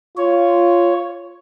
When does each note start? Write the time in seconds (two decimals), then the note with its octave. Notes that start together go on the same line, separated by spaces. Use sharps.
0.17 F4 C#5